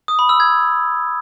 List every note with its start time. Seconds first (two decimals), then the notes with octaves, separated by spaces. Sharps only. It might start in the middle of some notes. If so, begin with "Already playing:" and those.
0.08 D#6
0.19 B5
0.29 E6
0.40 G#6